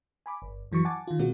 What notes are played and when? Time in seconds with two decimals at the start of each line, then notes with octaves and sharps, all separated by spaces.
0.26 G#5 B5 D6
0.42 G1
0.72 F#2 E3 F#3 C#6 C#7
0.85 F#5 G#5 A5 D6 A6
1.07 D#3 F4
1.19 B2 G#3 C4 F#4 A#4